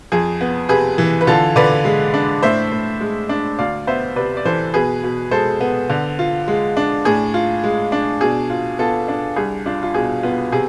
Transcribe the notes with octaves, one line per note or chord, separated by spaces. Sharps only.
F2 G#4
B3
C3 G#4 B4
E3
B4
D3 F4 A4
D3 B4 D5
G#3
D4
A2 C5 E5
A2
G#3
D4
D2 D5 F5
B3 C5 E5
C3 B4 D5
D5
E3 A4 C5
B2 G#4 B4
B2
G#3 A4 C5
B3
D3
F4
G#3
D4
A2 G#4
F4
G#3
D4
B2 G#4
F4
B3 F4 A4
D4
C2 G#4
D4 F4
F4
B2 G#4
B3 F4
C3 G#4